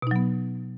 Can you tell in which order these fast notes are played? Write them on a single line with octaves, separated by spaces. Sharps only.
B2 D#4 F#3 B3